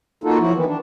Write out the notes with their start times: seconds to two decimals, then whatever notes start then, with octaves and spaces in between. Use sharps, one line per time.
0.24 A#3 D#4 F4 F#4 A4
0.40 F3 F#3 E4 F#4
0.54 D#3 E3 B3
0.66 D4